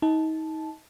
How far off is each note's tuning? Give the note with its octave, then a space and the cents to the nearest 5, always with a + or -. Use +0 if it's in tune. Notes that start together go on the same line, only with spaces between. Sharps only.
D#4 +30 A5 -10